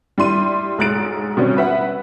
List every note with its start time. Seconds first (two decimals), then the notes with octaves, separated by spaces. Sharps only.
0.18 G3 E4 C6 D#7
0.78 B1 G#2 F#6 A6 D7
1.37 B2 G3 C4 C#4
1.57 B4 E5 F#5